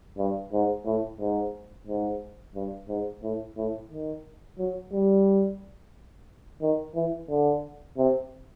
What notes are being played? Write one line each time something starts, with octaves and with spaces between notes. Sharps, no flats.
G2
G#2
A2
G#2
G#2
G2
G#2
A2
A2
D#3
F#3
G3
D#3
E3
D3
C3